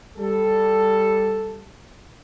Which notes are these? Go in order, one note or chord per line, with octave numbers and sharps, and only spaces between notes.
G3 A4